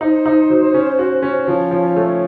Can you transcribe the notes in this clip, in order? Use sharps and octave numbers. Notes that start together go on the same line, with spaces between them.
D#4 C5
D#4
F#3
C#4
F#4
C#4
F3 C#5
F3
A3